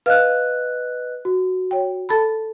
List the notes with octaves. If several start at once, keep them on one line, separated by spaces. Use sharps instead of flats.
B4 D#5 F5 F6 F#6
F#4
C#5 G5
A4 A5 B5